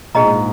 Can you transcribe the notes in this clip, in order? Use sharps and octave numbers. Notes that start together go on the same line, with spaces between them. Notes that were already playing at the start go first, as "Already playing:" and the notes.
A#2 D4 G#4 D#5 A#5
G#2